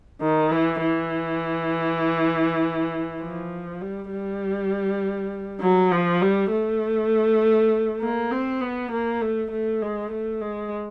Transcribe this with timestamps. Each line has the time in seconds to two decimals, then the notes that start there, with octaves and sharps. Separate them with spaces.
0.21 D#3
0.51 E3
0.81 E3
3.21 F3
3.82 G3
4.11 G3
5.61 F#3
5.91 F3
6.21 G3
6.51 A3
8.01 A#3
8.32 C4
8.61 B3
8.91 A#3
9.21 A3
9.51 A3
9.82 G#3
10.11 A3
10.41 G#3